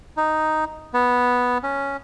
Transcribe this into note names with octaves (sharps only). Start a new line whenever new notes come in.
D#4
B3
C#4